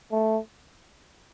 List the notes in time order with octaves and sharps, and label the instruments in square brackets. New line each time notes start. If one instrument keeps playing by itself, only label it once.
[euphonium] A3